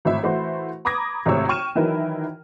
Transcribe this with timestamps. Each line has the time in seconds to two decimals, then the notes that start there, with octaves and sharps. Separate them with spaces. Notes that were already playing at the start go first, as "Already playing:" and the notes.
0.05 G#1 A2 E5
0.23 E3 A3 E4 F#4 C5
0.85 A#5 B5 D6 D#6 G#6 A#6
1.26 G#1 C3 A3 E4 C#5 E6
1.49 G5 C#6 F6 D#7 E7
1.75 D#3 E3 F#3 E4 A#4